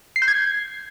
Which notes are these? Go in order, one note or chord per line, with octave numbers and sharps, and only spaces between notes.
C7
G6
G#6